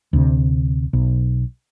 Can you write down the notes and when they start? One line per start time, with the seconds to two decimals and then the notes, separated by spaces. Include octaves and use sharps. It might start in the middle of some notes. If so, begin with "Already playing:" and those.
0.13 D2 C3
0.93 B1